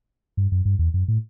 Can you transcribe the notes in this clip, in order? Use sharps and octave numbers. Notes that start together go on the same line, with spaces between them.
G2
F#2
G2
E2
F#2
A2